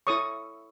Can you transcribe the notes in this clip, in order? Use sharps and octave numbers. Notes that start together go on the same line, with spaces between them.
E4 A4 C#5 C#6 D#6